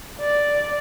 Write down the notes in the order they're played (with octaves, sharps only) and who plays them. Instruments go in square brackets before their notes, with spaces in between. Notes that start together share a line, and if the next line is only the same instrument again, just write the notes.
[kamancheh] D5